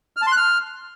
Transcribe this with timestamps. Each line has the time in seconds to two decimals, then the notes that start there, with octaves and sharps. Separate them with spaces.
0.17 F6
0.22 A5
0.27 C6
0.32 F#6
0.37 F6